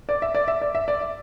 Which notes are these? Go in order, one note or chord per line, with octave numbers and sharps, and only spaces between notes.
D5
E5
D5
E5
D5
E5
D5
E5